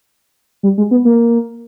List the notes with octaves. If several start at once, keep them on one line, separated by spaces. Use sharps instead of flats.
G3
G#3
B3
A#3